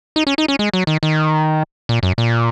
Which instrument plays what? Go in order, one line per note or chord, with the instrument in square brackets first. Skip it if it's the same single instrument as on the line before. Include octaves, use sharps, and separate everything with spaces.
[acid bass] D#4
C#4
D#4
C#4
G#3
F#3
D#3
D#3
A#2
F#2
A#2